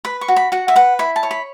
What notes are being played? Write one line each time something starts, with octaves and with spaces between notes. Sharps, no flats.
B4 B5
C#6
F#4
B5
F#4 F#5
E5
B4 F#5
E4 B5
A5
C#5
B5